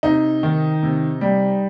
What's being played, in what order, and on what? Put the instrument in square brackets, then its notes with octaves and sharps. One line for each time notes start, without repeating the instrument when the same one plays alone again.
[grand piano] C3 D#4
D#3
C3
G3